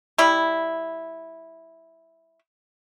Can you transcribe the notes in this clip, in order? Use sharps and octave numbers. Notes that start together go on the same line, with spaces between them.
G3 E4